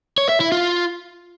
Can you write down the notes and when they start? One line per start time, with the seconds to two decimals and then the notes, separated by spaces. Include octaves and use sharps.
0.18 C#5
0.29 E5
0.41 E4
0.52 F4